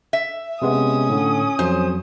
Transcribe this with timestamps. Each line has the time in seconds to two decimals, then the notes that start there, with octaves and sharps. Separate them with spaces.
0.13 E5
0.62 C3 G#3 B3 C#4 D#6
1.10 A2 D3
1.59 F2 F#3 C5